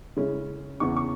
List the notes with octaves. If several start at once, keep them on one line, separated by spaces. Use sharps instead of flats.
C#3 G#3 C#4 E4
E2 C#3 E3 C#6
C#6